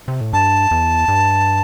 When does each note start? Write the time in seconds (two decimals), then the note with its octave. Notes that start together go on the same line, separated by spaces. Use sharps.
0.08 C3
0.21 A2
0.33 G2 A5
0.71 E2
1.08 G2